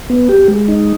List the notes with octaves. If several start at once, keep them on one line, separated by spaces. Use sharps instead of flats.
B3
G4
G#3
D#4